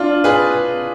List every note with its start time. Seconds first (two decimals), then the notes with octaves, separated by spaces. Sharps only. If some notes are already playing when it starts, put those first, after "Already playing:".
Already playing: D4 F4
0.24 G#4 B4